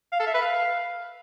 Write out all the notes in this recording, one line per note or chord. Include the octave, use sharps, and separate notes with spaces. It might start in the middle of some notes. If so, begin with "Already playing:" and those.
F5
A4
E5
B4
F5